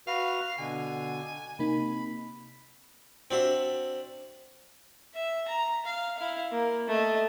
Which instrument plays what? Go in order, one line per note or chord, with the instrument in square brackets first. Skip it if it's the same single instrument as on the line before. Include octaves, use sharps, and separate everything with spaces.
[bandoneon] F#4 B4 [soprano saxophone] F5
[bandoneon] B2 D3 [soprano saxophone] G#5
[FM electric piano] C3 A#3 D#4 [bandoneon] B5
[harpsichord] C4 D4 F#4 E5
[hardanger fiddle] E5
A#5
F5
E4 F5
A#3
A3 D#5